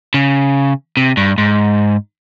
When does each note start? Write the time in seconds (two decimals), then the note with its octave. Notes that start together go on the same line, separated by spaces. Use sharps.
0.14 C#3
0.97 C3
1.17 G2
1.38 G#2